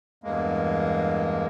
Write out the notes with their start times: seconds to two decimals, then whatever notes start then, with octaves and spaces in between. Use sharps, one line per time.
0.24 E2 G2 G#3 A#3